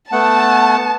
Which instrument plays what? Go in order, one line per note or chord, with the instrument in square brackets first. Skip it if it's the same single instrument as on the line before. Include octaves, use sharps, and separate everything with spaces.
[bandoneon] A3 B3 F#5 [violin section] A5